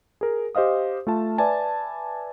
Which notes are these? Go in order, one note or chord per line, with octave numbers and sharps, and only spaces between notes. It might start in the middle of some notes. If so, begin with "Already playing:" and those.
G#4 A#4
G4 C5 D#5 F5 D#6
A3 F4 A5
B4 D5 E5 G#5 A5